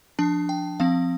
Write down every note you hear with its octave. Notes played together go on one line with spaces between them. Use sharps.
F3 D4 A5
G5
F3 C4 F5